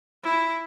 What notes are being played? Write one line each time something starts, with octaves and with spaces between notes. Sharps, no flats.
E4